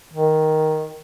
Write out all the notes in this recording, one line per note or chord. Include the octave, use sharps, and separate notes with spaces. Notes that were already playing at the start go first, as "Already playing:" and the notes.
D#3